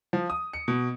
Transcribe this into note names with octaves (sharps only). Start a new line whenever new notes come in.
F3
D#6
C#7
B2